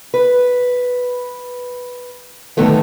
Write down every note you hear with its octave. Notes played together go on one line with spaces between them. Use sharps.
B4
A2 D3 D#3 F#3 A3 B3